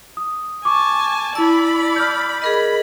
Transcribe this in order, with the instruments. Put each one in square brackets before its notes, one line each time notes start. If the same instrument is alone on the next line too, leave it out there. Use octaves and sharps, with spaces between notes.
[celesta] D#6
[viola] G#5 A5 [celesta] C#6 D6
[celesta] E4 A5 [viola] D5 B5 [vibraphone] E6
[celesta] F6 G6
[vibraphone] G#4 A#4 D#5 [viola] B5